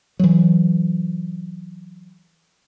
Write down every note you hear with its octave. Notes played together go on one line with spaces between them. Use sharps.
E3 F#3